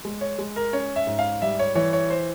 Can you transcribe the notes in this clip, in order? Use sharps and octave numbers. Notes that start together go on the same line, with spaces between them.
G#3
C#5
G#3
A#4
C#4 C#5
E5
G#2
F5
G3 E5
C#5
E3 C#5
C#5
C5